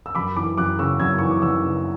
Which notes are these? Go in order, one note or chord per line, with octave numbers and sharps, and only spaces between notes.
E6
F#2 B5 D6
E3 B5 D6
F#2 D6 F#6
C#3 C#6 E6
F#2 E6 G#6
E3 C#6
D6
F#2 C#6 E6
C#3